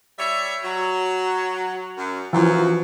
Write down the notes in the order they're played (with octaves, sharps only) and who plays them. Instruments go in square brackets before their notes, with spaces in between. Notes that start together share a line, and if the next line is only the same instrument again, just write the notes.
[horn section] G3 C#5 E5
F#3
F#2
[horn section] F#2 [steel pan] E3 F3